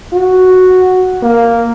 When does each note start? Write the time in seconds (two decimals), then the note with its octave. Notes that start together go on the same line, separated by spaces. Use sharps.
0.13 F#4
1.23 A#3